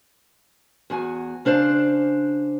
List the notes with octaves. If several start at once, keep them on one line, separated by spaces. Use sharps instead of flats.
E2 F#4 G#5
C#3 D4 C5 F5 A5